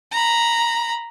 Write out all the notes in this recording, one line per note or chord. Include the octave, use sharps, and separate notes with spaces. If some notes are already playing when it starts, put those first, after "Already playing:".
A#5 B5